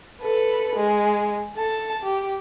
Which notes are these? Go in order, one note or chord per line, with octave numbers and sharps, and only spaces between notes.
A4 B4
G#3
A4 A5
G4